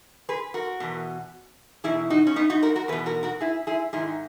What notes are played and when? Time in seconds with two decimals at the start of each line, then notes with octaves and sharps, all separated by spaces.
0.29 G#4 B4
0.54 F#4 A#4
0.80 E2 B2
1.84 E2 B2 E4 G#4
2.10 D#4 F#4
2.27 C#4
2.36 B3 D#4
2.50 D#4 F#4
2.63 F#4 A#4
2.76 F#4 A#4
2.88 E2 G#4 B4
2.93 B2
3.06 F#4 A#4
3.23 F#4 A#4
3.41 E4 G#4
3.67 E4 G#4
3.93 G#2 D#3 E4 G#4